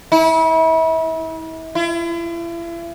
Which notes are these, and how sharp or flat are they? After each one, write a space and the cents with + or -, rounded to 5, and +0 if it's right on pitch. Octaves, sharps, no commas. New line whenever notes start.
E4 -35
E4 +40